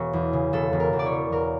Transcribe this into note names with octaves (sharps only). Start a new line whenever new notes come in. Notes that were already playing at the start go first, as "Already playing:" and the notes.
Already playing: E1 C#5
E2
C#3
E1 A4
E1
A#4
E2
D5
C#5
C#3
E1 A#4